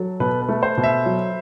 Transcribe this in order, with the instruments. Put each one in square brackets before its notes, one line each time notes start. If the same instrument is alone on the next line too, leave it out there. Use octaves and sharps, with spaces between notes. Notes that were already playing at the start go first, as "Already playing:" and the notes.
Already playing: [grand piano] F#3 [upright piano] A4
[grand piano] B2 [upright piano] B4
[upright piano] B4
[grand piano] A3
[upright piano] C5
[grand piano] B2
[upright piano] E5
[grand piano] F#3